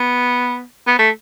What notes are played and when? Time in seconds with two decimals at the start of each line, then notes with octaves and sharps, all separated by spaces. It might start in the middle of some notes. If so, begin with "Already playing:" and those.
Already playing: B3
0.87 B3
0.99 A3